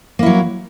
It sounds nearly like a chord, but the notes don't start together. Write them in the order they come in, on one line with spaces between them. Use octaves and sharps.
A#3 E4 F#3